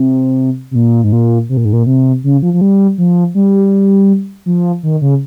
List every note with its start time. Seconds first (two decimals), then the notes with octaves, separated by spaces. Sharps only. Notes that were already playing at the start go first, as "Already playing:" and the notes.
Already playing: C3
0.71 C3
0.75 A#2
1.04 G#2
1.12 A#2
1.49 C3
1.57 A#2
1.65 G#2
1.73 A#2
1.86 C3
2.24 C#3
2.42 F3
2.54 F3
2.61 G3
2.98 F3
3.35 G3
4.46 F3
4.83 D#3
5.02 C#3